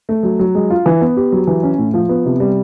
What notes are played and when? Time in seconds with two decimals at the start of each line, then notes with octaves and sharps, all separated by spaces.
0.09 A3
0.23 F#3
0.39 F#3
0.55 G#3
0.70 F4
0.86 E3
1.01 B3
1.17 G4
1.32 F#3
1.47 E3
1.63 C#4
1.78 A2
1.94 F3
2.09 B3
2.25 C3
2.40 G3